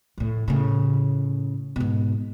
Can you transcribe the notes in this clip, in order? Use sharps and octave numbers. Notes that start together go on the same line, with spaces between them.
A2 F3
A2 C#3
G#2 B2